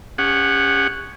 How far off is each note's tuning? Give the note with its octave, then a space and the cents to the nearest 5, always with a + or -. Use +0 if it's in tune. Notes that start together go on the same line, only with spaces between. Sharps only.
C#4 +10 G4 +45 F#5 +0